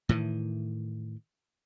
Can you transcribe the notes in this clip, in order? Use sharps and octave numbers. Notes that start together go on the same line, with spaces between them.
A2 D#3 E3